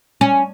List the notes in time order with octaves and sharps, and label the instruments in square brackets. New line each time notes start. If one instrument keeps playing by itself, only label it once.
[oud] C#4